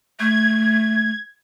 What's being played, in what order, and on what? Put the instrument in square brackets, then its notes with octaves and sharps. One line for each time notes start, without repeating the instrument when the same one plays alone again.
[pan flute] A3 [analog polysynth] G#6